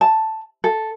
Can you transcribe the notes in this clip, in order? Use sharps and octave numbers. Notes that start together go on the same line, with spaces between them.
A5
A4